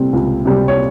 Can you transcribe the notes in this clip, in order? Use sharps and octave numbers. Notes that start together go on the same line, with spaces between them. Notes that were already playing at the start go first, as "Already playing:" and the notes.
Already playing: C3 G3 C4
C#2
C3 G3 C4
C#5